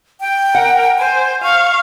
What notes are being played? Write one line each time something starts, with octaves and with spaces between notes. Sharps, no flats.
G5
A#4 F#5
C5 G#5
F5 C#6